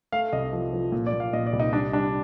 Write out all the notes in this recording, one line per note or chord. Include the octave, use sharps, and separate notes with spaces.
A3 F5
C2 D#5
F3
F3
A#2
D5
A#2
F5
A#2 D#5
D5
C2
D#4
G3 D4
G3 D4